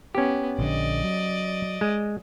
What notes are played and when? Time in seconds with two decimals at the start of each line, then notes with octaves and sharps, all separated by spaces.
0.15 B3 C#4 G4
0.59 A#1 D3 D5 D#5
1.04 F#3
1.81 G#3